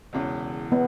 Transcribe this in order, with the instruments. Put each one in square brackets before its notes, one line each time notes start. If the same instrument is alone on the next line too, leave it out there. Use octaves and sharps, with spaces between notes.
[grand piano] E1 E2 C#3
[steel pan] B3